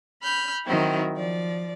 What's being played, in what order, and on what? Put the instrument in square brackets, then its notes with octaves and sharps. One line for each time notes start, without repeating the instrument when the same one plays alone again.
[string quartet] B5 F6 G6
D#3 F#3 C4 E4
F3 D5